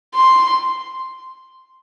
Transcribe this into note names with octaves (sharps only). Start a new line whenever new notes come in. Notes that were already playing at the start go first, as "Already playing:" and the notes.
C6